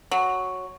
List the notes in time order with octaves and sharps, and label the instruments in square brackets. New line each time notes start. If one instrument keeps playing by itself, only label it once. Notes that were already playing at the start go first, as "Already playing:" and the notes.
[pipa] F#3